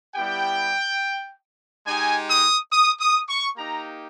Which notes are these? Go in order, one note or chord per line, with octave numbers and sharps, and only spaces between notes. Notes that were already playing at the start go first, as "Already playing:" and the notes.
G3 B3 E4 G4 G5
G#3 D#4 G4 G#5
D#6
D#6
D#6
C#6
A#3 D#4 G4 A#5